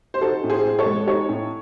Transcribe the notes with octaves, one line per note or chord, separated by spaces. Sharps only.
C5
D#4 F#4 A4
A2
G#4 C5
A2
A4 C#5
G#3
D#4 A4 C#5
A2